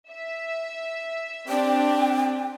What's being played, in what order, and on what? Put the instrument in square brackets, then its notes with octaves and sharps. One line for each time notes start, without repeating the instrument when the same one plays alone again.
[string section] E5
[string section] C4 D4 G4 [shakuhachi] G5